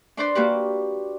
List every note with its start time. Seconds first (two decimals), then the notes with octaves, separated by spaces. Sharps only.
0.17 D4 B4 C5 D5
0.35 A#3 F#4 G4 B4